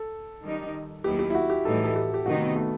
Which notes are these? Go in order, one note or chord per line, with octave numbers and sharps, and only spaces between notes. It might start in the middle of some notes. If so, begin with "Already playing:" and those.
Already playing: A4
D#3 G3 D#4
D#2 D#3 F#3 B3 E4 G4
G4
E4
F#4
G4
A2 E3 G3 D#4 A4
A4
G4
G4
C3 D#3 A3 D#4 F#4
B3
A3